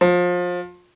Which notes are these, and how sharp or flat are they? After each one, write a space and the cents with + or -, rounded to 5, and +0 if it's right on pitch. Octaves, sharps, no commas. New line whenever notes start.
F3 +25